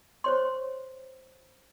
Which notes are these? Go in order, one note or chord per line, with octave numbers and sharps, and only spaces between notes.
C5 C#5 C6